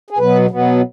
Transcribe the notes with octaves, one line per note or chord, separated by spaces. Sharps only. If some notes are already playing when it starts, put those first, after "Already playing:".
G#4
B2 F#3 B3 B4
B2 F#3 B3